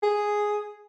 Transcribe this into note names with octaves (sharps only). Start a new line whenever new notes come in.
G#4